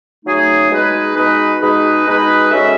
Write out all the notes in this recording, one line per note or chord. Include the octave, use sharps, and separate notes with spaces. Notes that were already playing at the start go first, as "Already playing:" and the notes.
C#3 F#3 A3 D#4 G#4
B2 G#3 D#4 G#4 B4
B2 G#3 D#4 G#4 B4
B2 G#3 D#4 G#4 B4
B2 G#3 D#4 G#4 B4
G#3 C#4 F#4 A4 E5